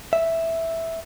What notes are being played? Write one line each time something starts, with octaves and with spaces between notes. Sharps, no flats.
E5